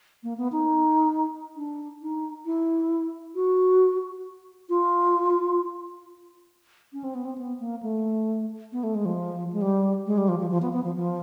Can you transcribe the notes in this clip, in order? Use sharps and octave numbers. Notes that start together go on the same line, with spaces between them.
A#3
B3
D#4
D4
D#4
E4
F#4
F4
C#4
C4
B3
C4
B3
A#3
A3
B3
A3
G#3
F3
G#3
G3
G#3
G3
F3
F3
F3
B3
B3
F3
F3